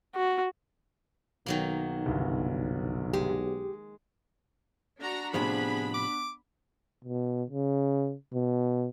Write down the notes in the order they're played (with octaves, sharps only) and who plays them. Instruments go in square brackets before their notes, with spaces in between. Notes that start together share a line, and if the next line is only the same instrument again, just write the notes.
[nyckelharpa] F#4
[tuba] B1 [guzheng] D#3 F#3 A#3
[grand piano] G1 C2
[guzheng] G#3 [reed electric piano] G4
[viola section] D4 F#4 A#5
[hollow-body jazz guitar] A2 C3 F3 [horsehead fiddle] B3 D4 [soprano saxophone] G#4 [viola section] B5
[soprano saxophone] D6
[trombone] B2
C#3
B2